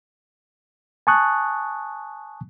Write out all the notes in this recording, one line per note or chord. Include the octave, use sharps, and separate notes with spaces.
G#5 A5 C#6 D#6 F#6